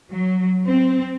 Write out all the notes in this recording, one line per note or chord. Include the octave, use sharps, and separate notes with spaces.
F#3
C4